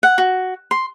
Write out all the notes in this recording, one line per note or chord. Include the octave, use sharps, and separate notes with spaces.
F#5
F#4
C6